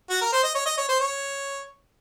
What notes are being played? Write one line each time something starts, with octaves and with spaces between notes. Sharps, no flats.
F#4
A#4
C5
D#5
C#5
D#5
C#5
C5
C#5